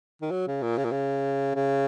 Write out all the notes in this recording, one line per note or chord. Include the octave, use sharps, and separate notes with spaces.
D#3
F#3
C#3
A#2
C#3
A#2
C#3
C#3